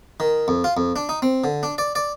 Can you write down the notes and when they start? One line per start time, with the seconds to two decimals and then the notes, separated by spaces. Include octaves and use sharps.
0.20 D#3
0.48 F2
0.64 F4
0.77 F2
0.96 D4
1.09 D#4
1.22 C4
1.44 D3
1.63 D4
1.78 D5
1.95 D5